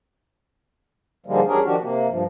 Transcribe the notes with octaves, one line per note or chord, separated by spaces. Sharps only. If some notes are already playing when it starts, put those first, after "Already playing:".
G#2 D3 F3 G3 G#3 A#3
E2 G3 C#4 D4 G#4 A#4
D#3 F3 D4 F#4 G4
C3 A#3
G2 F3